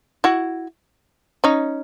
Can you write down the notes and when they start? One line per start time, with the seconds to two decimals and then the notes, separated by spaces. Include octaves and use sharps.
0.24 E4 F#4
1.44 C#4 D#4